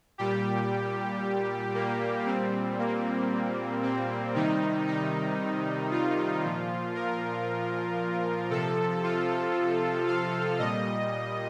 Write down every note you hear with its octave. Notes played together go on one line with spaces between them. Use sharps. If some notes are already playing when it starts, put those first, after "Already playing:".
A#2 G3 G4
A#3
A#2 G3 C4
A#3
C4
C3 D#3 G3 D#4
D#4
F4
A#2 F3
A#4
C3 F3 A4
F4
F5
A#2 G3 D#5